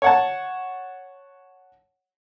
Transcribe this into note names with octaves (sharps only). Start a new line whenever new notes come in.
C#5 F#5 A5